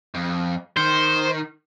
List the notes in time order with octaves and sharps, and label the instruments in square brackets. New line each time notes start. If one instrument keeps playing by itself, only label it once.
[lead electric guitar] F2
[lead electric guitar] D#3 [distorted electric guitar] C5